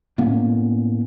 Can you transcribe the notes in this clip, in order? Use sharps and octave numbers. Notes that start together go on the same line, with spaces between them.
A2 A#3 B3 C#4